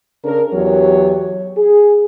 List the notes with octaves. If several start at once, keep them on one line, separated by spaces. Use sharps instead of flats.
C#3 D4 A#4
E2 F#3 F#4 G4 C#5
G#4